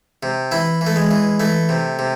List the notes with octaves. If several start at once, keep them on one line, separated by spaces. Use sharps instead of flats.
C3
E3 E4
E3
A3
G#3
E3
E3 A3
C3
C3